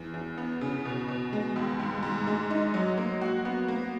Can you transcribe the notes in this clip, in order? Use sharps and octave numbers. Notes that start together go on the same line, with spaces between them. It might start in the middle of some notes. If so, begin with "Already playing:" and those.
Already playing: E2
E2
B3
C#3
B2
B2
G#3
D#2
G#2
G#2
G#3
D#4
F#3
A#3
F#4
B3
A#3